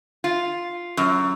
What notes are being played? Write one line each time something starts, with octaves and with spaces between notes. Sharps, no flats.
F4
F#2